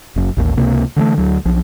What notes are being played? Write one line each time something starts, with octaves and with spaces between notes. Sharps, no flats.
F#1 F#2
A1 D#2
C#2 C3 A#3
D3 E3 G#3 A3
D2 F#3
B1 F3